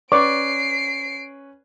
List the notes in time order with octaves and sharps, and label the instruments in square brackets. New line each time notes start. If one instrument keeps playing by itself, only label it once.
[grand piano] C#4 B4 [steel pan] D5 C#6 D6 [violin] C7 D7